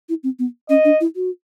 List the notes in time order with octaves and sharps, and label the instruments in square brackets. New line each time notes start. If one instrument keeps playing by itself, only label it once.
[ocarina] E4
C4
B3
[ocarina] C#4 [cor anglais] D#5
[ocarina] D4
E4
F#4